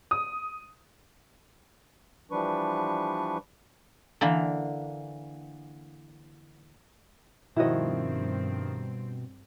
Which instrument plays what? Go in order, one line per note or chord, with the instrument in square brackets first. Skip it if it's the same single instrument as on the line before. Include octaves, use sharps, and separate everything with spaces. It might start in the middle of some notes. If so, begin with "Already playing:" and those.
[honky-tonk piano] D#6
[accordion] E3 F3 G3 D4 B4 C#6
[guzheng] D3 E3 A#3
[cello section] G2 C4 [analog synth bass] B2 [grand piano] D#3 F3 [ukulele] E4 F#4 D#5